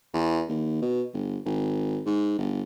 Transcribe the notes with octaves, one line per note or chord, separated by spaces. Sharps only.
E2
D#2
B2
G1
G#1
G#2
G1